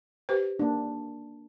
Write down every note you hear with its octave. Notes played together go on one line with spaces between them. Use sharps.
G4 B4 C5
A#3 D4